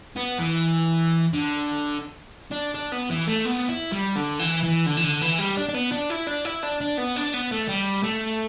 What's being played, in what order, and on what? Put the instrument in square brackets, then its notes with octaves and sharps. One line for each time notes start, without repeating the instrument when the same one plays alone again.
[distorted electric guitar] B3
E3
D3
D4
D4
B3
E3
A3
B3
E4
G3
D3
E3
E3
D3
E3
D3
E3
G3
D4
D4
B3
D4
E4
D4
E4
D4
D4
B3
D4
B3
A3
G3
A3